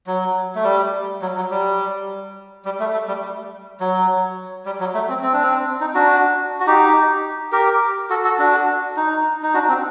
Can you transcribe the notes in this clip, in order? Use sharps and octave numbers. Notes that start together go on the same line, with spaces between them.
F#3
A3
G3
F#3
F#3
G3
G3
A3
A3
G3
F#3
G3
F#3
A3
C4
C4
D4
C4
D#4
D4 F#4
F#4
D#4 G4
G4 A#4
F#4 A4
F#4 A4
D4 F#4
D#4
D#4
D4 F#4
C4